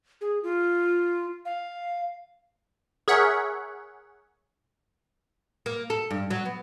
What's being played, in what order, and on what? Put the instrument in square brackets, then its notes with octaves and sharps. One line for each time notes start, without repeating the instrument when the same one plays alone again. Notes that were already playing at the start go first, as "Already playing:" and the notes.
[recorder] G#4
F4
F5
[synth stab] G#4 A#4 C#5 E5 F#5
[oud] A#3
A4
G2
F#3
B3